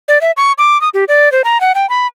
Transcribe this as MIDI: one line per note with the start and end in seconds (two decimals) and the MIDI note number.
0.08 0.21 74
0.21 0.31 76
0.37 0.52 85
0.58 0.80 86
0.81 0.89 87
0.94 1.04 67
1.08 1.31 74
1.32 1.42 72
1.44 1.60 82
1.61 1.72 78
1.75 1.89 79
1.90 2.07 83